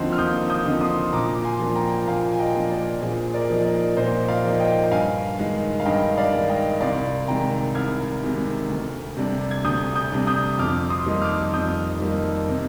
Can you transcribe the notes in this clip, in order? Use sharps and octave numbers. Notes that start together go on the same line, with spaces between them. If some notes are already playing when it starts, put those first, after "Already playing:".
Already playing: D#2 D3 F3 C4 D#4 C6
F6
D#2 D#6 G6
D#6 G6
D3 F3 C4 D#4
C6 D#6
A#2 A#5 D6
D6
G#5 C6
F3 A#3 D4
G5 A#5
G5
A#2 F5 G#5
G#5
D#5 G5
F3 A#3 D4
A#4 D5
A#2 G#4 C5
A#4 D5
F3 A#3 D#4
A#4 D5
A#2 C5 D#5
D5 F5
F3 A#3 D#4
D#5 G5
G2 F5 G#5
D#3 G#3
F5
G2 D#5 G5
D5 F5
D#3 G#3
D#5 G5
C2 D5 F5
C3 D#3 G#3 G5 A#5
C2 F6 G#6
C3 D#3 G#3
D2
C3 G3 D4
G#6
D2 D#6 G6
D#6 G6
C3 G3 D4
D#6 G6
F2 D6 F6
C6 D#6
D#3 G3 A#3 D#4
D6 F6
F2 D#6 G6
D#3 G3 A#3 D#4
C3